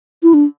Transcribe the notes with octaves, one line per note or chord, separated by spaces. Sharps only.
E4
D4